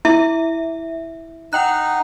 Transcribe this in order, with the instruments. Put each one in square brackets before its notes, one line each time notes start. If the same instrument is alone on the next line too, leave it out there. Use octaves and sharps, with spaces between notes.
[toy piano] E4 [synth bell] E5
[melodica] D#4 [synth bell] F#5 G5 F#6